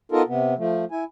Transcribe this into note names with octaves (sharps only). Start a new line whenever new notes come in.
B3 D#4 F4 A4 A#4
C3 B3
F3 A3
E4 G#5